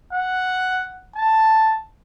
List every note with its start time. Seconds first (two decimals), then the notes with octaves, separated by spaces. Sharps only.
0.13 F#5
1.16 A5